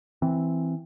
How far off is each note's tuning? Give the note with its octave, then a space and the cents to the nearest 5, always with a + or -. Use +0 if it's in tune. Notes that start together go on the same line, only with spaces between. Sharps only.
E3 +0 C4 +0